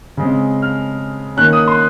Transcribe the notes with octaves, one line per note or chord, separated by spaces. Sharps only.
C#3 G#3 C4
F6
D#3 A#3 C#4 F#6
D#6
C6